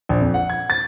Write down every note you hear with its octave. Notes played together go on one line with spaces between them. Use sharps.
A#1
F2
F#5
G#6
A6